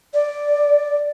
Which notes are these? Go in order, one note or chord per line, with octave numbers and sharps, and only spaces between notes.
D5